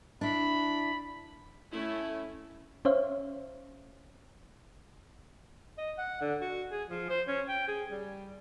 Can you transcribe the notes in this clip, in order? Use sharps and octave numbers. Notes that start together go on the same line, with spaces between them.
D4 E4 B5
A3 C#4 E4
C#4 C5 C#5 E5 F5
D#5
F#5
D3
F#4
G#4
F3
C5
C#4
G5
G#4
G3